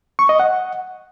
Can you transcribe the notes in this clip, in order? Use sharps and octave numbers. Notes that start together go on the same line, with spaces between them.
C#6
D#5
F#5